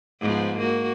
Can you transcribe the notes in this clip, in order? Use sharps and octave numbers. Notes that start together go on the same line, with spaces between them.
G#2 F3 B3
A#3 F#4